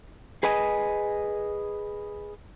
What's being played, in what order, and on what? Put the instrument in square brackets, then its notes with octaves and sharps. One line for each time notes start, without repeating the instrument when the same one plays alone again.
[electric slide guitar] G#4 B4 D#5 G#5